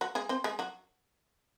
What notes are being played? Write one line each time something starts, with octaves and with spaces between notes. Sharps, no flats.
F#3 F#4
G#3 G#4
C4 C5
G#3 G#4
F#3 F#4